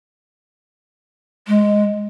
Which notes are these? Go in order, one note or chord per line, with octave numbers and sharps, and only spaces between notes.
G#3